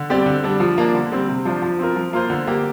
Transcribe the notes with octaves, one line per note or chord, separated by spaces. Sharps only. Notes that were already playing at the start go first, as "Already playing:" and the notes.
Already playing: D3
G3 C4 G4 D5
D3
G3 D4
F3
A#3 D4
D3
G3 C4
C3
F3 D4 F4 C5
F3
C4 F4 A#4
F3
A#3 F4 C5
D3
A#3 G4